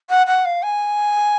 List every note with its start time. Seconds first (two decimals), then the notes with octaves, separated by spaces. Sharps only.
0.09 F#5
0.27 F#5
0.45 F5
0.63 G#5